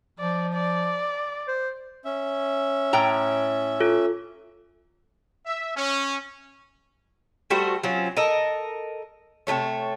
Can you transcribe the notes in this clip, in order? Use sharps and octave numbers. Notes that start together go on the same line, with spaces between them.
F3 D5
D5
C5
C#4 E5
A2 G5 A#5
F4 A4
E5
C#4
G3 A3 F#4 C5
F#3 C4 C#4 F4
A4 A#4 D#5
C3 E3 A3 C#5